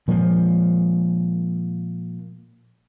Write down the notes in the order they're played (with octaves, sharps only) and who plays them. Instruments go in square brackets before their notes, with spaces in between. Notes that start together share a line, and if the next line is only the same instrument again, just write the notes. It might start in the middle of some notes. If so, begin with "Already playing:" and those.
[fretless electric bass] A#2 F3 G#3